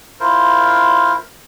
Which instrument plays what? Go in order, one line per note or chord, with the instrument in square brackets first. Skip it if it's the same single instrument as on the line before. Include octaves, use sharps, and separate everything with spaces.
[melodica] E4 F4 A#4 C5